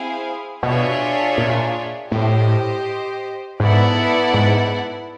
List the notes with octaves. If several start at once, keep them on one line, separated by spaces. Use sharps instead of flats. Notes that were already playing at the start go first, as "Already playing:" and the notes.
Already playing: C4 E4 G#4 C5 F5
B2 D4 F4 G#4 C#5 E5
A#2
A2 G4 C5 D#5
G#2 B3 E4 A4 D5 F#5
G#2